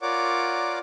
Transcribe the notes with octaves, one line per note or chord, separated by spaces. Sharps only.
F4 A#4 C#5 D5 F#5 D6